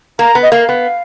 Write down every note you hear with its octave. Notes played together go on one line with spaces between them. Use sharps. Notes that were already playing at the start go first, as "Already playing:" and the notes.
A#3 A#5
B3
D#5
A#3 F5
B3